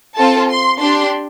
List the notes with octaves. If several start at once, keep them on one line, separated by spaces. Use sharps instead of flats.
C4 F4 A4 A5
C6
D4 G4 C6